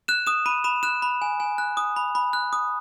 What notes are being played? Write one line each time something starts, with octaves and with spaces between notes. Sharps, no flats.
F#6 E7
D#6 E7
B5 D#7
B5 E7
F#6 E7
B5
G#5
G#5
F#6
D#6
B5
B5
F#6
D#6